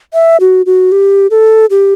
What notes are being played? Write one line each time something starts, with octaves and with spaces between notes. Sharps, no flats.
E5
F#4
F#4
G4
A4
G4